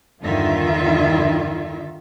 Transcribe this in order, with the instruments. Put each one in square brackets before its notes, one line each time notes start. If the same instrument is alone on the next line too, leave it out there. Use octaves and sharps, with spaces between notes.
[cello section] E2 G2 D3 D#3 F4 E5